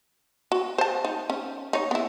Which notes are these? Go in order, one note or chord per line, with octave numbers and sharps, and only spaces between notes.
F#4
C5 A5
D#4
C#4
D#4 C#5
B3 E4